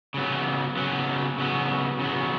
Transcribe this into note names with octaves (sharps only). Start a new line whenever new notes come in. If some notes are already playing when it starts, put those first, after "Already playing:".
C#3 F#3 B3
C#3 F#3 B3
C#3 F#3 B3
C#3 F#3 B3